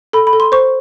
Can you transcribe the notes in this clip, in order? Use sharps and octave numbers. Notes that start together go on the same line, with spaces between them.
A4 B5
B5
A4
C6
C5 C#6